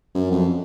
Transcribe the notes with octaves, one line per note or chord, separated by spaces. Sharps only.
F#2
F2